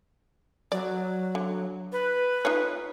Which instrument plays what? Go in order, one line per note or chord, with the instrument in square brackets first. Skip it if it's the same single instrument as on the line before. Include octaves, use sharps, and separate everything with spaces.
[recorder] F#3 [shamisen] D5
[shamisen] D3
[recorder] B4
[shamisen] D#4 F4 C#5